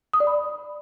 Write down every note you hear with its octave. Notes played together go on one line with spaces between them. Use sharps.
D#6
D5
B5